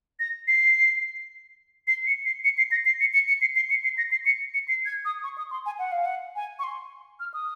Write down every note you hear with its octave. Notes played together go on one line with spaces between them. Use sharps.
A#6
C7
C7
C#7
C7
C#7
C7
A#6
C7
C#7
C#7
C#7
C7
C7
C#7
C7
A#6
C7
C#7
C#7
C7
G#6
D#6
C#6
D#6
C6
G#5
F#5
F5
F#5
G#5
C#6
C6
F6
D#6